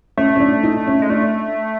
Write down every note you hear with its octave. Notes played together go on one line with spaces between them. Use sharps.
A3 C#4
C#4
D4
D#4
C#4
G#3
A3 D4